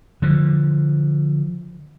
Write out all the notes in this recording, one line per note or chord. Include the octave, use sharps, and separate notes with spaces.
D3 F3